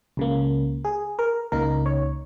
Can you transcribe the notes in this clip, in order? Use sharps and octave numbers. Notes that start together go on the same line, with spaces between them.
C#2 C#3 A#3
G#4
A#4
C#2 C#3 A#3 D#4 A#4
C#5